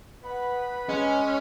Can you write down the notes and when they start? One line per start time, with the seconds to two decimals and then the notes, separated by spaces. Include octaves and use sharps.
0.23 B3 B4 B5
0.89 G#3 C#4